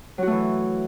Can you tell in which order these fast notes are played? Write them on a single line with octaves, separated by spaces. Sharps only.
F#3 F#4 A3 E3